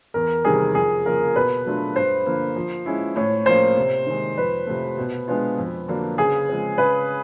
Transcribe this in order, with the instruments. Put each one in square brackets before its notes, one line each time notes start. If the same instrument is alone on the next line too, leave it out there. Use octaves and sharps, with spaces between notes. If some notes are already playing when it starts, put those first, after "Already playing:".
[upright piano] E2 [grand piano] A#4
[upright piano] C3 D#3 G3 [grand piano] G#4
[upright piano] F2 [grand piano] G#4
[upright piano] C#3 F3 A#3 [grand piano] A#4
[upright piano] B2 [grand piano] B4
[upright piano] F#3 A3 D4 F4
[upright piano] G2 [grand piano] C5
[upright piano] D3 F3 A#3
F3
G#3 C#4 E4
[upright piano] A2 [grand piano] C#5
[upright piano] F3 A#3 C#4 F4 [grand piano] C5
[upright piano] C3
D#3 G#3
[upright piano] F2 [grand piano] B4
[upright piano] C3 F3 A3
B2
G#3 B3 D4 F4
F2
D3 F#3 A#3 D4
[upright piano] C#3 [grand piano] G#4
[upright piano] F3 G#3 C4
[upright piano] C#3 [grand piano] B4